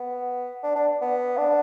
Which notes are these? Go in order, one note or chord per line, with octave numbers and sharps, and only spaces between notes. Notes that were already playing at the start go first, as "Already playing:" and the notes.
Already playing: B3
D4
D4
B3
D4